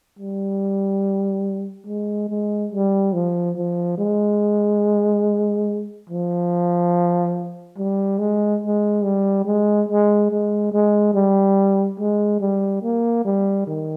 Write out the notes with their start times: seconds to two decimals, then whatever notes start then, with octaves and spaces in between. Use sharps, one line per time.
0.19 G3
1.87 G#3
2.29 G#3
2.72 G3
3.13 F3
3.56 F3
3.98 G#3
6.09 F3
7.78 G3
8.19 G#3
8.62 G#3
9.04 G3
9.45 G#3
9.89 G#3
10.31 G#3
10.72 G#3
11.14 G3
11.99 G#3
12.40 G3
12.83 A#3
13.25 G3
13.67 D#3